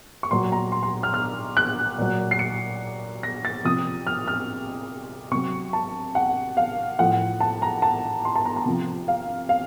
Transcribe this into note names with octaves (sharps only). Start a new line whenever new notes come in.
C#6
A#2 F#3 C6
A#5
C6
C6
F6
F6
F#6
A#2 F#3
C7
C#7
A#6
A6
C3 F3 D#6
F6
F6
C3 F#3 C#6
A5
F#5
F5
A2 F3 F#5
A5
A#5
A5
C6
A5
A#5
A#5
C3 F3
F5
F5